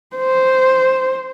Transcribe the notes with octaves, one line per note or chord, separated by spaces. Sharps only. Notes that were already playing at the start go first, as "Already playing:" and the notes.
C5